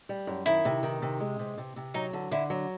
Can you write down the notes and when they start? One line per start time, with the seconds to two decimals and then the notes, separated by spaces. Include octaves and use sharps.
0.09 G3
0.27 F#2
0.46 D#3 E4
0.65 C3
0.83 D#3
1.02 C3
1.20 G#3
1.39 C3
1.58 C3
1.76 C3
1.94 F#3 D#4
2.13 D3
2.31 D3 E4
2.50 F#3